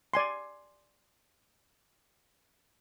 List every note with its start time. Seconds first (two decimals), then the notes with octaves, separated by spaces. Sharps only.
0.14 D5 G#5 C6